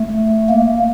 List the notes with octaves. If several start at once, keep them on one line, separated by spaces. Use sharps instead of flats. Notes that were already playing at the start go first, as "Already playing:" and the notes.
Already playing: A3
A#3